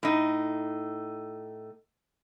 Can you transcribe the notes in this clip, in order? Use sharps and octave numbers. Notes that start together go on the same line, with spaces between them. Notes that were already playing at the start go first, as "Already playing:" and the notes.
A2 D#4